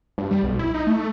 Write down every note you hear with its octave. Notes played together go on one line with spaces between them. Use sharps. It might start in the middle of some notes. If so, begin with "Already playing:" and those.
G2
G3
B1
E4
D#4
A3